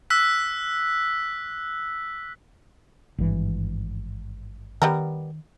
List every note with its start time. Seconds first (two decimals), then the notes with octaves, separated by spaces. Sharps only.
0.10 E6 F#6 B6
3.18 G#1 G2 E3
4.82 D#3 G3 B3 A#4